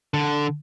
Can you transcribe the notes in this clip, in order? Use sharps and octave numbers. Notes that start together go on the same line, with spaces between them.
D3